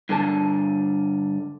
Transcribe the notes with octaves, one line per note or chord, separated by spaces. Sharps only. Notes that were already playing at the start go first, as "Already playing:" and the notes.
G2 D3 A#4 A5